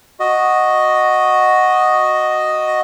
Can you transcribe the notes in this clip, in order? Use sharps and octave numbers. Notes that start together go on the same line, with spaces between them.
F#4 D#5